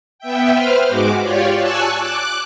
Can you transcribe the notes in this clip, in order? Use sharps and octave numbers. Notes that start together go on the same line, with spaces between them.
B3 E5 G5
B4 C5 F6
G#2 G#3 F#4 D6
F4 G4 C#5 D5
G#5 A5 C#6 E6 F#6
D6 F#6